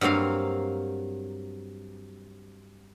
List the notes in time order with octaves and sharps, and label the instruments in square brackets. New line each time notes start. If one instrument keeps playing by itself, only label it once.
[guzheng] G2 F#3 A#3 C4 F5